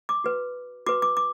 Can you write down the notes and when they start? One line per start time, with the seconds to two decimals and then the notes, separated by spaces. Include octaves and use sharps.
0.09 D6
0.24 F#4 B4
0.86 F#4 B4 D6
1.02 D6
1.17 D6